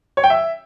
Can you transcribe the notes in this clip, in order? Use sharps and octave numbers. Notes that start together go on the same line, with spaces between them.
C#5
G5
E5